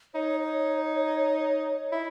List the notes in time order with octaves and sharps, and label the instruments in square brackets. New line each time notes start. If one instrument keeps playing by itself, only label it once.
[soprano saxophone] D#4 [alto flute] C#5
[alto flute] C#5
[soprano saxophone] E4